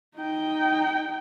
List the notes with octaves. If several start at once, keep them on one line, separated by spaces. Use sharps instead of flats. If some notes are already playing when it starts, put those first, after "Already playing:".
D#4 G5